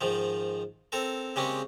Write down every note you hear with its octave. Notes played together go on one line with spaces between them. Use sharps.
G#2 D#3 F3
C4 A4 A#4
C#3 G3 G#3 A#3 C4 C#4